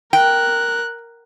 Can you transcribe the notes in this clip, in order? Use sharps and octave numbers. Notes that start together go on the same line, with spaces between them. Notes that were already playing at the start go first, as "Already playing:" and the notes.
A#4 G5 F#6